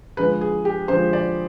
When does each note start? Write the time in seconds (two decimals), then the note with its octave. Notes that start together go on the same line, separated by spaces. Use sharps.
0.17 D3 F3 G#3 B4
0.41 G#4
0.65 G4
0.88 D3 F3 G#3 C5
1.13 D5